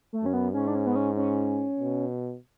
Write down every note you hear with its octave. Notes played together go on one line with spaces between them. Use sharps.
A3
F#2 C#4
B3
G#2 C#4
D4
C#4
B3
C#4
C#4
B2